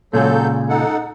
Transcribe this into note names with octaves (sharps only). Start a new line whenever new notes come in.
A#2 C#3 F#3 G#3 A4 G6
D#4 A4 F#5